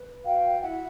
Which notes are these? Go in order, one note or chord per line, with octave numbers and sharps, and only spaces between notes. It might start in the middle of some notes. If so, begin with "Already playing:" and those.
Already playing: B4
F#4 F5 G5
E4 E5 F#5